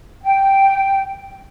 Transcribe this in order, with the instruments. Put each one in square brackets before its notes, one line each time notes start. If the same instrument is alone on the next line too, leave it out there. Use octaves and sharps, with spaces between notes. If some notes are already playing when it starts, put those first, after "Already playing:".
[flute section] G5